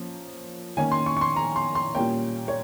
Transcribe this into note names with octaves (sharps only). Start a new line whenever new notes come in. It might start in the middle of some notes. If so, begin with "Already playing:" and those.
Already playing: F3 A#3 C#4
D#3 A#3 C#4 G#5
C6
C#6
C#6
C6
A#5
C6
C6
A#2 G3 A#3 C#4 G5
C#5